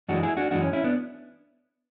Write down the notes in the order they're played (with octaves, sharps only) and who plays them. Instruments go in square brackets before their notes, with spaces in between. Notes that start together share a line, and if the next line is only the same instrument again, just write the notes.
[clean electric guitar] F#2 E3 G#3 D4 F#4
E4 G#4
D4 F#4
F#2 E3 G#3 D4 F#4
C#4
C#4 E4
B3 D4